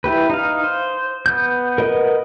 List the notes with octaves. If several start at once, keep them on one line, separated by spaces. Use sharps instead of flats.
E4 G4 B4
D#4 F5
C5
B3 G6
A#4 B4 D#5 F#5